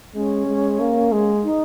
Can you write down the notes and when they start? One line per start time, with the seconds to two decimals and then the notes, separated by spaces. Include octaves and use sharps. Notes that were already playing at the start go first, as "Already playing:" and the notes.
0.15 G#3 C#4
0.47 G#3
0.80 A#3
1.12 G#3
1.44 D#4